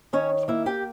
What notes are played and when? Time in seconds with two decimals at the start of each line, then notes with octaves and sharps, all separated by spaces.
0.13 D#3 C#4 C#5
0.48 A#3 E4 E5
0.66 G4 G5